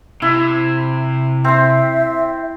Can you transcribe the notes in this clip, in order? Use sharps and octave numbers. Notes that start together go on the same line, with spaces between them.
C3 E4
C4 E5 C6